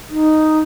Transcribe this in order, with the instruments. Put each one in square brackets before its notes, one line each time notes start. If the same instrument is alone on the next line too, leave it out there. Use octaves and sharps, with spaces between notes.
[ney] D#4